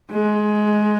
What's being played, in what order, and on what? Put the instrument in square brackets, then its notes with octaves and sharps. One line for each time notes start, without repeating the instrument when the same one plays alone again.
[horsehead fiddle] G#3